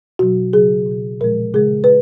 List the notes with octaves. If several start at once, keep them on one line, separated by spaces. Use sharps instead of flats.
B2 F#3 F#4
C#3 F#3 G#4
B2 F#3
A#2 F3 G#3 A#4
C#3 G#3 G#4
B4